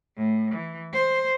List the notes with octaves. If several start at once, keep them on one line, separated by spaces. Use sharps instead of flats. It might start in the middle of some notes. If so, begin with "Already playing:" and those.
A2
E3
C5